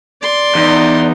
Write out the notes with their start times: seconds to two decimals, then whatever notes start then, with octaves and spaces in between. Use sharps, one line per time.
0.21 D5 C6
0.55 E2 B3 D#4